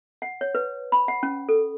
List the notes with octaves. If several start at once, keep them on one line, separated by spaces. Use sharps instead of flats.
F#5
C#5
B4
B5
F#5
C#4
A4